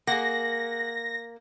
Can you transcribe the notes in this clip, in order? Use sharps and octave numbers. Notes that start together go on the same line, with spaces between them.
A#3 G#4 F#5 A#6